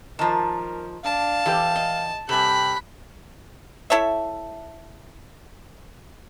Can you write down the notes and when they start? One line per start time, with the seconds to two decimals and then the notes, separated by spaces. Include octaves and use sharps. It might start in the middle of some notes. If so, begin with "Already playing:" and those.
0.19 D#3 F3 A#4 A5 A#5
1.04 D4 F5 A5
1.46 E3 G4 A4
1.76 D#5
2.29 C3 G3 G4 A4 G#5 B5 F#6
3.90 E4 A4 C#5 E5